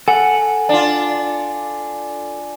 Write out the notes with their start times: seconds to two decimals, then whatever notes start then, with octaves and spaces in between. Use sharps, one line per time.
0.08 A4 F#5 G#5
0.69 D4 F4